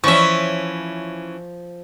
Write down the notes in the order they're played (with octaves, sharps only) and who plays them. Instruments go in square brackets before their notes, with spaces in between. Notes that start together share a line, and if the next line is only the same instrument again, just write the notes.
[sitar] E3 C#4 [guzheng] F3 E5 [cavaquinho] C#6